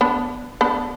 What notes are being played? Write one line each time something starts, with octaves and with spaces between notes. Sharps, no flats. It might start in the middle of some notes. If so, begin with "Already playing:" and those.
B3 D4
B3 D4